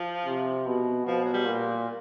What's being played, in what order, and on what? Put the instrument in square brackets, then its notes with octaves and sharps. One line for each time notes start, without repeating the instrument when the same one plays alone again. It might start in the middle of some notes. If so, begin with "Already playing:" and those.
Already playing: [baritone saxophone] F3
[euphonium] C3
B2
[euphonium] B2 [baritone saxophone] F3
[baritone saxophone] F#3
G3
[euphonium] A#2